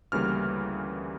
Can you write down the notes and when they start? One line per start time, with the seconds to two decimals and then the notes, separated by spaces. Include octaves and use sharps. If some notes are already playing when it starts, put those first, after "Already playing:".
0.12 D2 C#3 E3 G3 A#3 F6